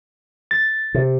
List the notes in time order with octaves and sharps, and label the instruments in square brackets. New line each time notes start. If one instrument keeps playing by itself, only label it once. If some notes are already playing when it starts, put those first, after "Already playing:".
[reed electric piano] A6
[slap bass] C3